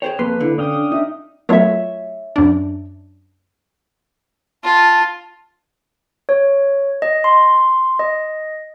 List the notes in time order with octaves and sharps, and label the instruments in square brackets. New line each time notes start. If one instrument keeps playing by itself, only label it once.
[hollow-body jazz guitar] G#4 C5 C#5 [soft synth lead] G5
[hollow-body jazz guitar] F2 C6 [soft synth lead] A#3 [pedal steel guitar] B4
[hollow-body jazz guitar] D3 [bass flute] E4
[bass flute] C#4 [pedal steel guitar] D4 F5 G5 [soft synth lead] D#6
[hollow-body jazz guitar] D#4 [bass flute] E5
[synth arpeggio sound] F#3 A3 F4 [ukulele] C#5 E5
[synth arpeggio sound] F#2 D4
[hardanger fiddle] F4 [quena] A5
[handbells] C#5
D#5
C6
D#5